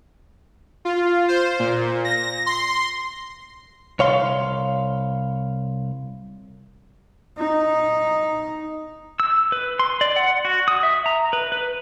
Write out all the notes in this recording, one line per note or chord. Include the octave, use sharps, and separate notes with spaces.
F4
C5
A#2
A#6
C6
C2 C#5 F5 C6
D#4
E6
B4
C6
D5
F#5
F#4
D#6
E5
A#5
B4
B4